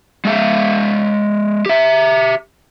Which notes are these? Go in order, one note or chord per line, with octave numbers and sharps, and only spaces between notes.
G#3 E5 F5
G4 E5